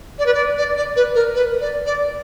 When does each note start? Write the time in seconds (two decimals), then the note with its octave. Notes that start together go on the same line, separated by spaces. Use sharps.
0.18 D5
0.26 B4
0.34 D5
0.57 D5
0.76 D5
0.95 B4
1.14 A#4
1.34 B4
1.60 D5
1.85 D5